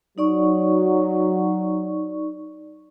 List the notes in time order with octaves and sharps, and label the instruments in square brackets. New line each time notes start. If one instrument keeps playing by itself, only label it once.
[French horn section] F#3 [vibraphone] D#4 D5 C#6